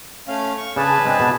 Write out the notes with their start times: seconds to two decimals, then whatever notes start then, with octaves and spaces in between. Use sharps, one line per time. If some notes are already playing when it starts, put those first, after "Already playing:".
0.28 A3 C#4 F5
0.58 C#6
0.76 C#3 D4 G#4 B4 A5
1.05 G#3 C4 D4
1.20 B2